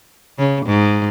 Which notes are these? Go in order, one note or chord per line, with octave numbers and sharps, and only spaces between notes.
C#3
G#2